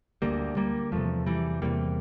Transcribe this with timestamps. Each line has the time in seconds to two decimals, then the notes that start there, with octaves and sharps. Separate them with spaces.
0.22 D2 D3 G3 A#3
0.57 G3 A#3
0.92 E2 C3 F3 A3
1.26 E3 G3
1.62 E2 C3 G3 A#3